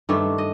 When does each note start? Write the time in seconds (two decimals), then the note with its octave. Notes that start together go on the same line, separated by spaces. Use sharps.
0.09 G2 D#3 A3 D4
0.38 D#5